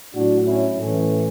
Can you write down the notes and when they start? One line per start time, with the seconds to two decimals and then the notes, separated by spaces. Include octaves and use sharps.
0.14 A2 F#3 D4 F#4
0.46 C#4 E4
0.78 A2 E3 A3 C#4